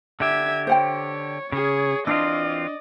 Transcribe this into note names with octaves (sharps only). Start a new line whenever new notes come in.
D3 G4 E5 G#6
C5 C#5 F#5 G5
C#3 G#4 C#5
E3 C4 D4 F4 D5 D#5